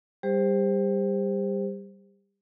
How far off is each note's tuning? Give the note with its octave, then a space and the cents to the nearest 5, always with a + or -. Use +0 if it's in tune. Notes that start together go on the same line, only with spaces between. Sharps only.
G3 +0 G4 +35 C5 +0